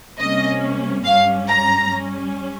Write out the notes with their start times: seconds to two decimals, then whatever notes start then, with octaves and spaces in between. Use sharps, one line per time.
0.19 C3 G3 A#3 C#4 D#5
1.05 G2 G3 C#4 F5
1.48 A#5
1.91 G3 C#4